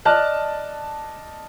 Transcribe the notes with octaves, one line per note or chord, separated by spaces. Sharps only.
D5 D#5 A5 F6 F#6